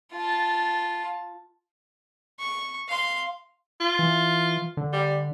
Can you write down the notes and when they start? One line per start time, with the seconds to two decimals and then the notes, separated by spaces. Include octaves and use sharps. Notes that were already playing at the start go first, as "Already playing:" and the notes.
0.13 F4 A5
2.39 C#6
2.88 F5 C6
3.80 F4
3.99 E3
4.77 D3
4.93 G3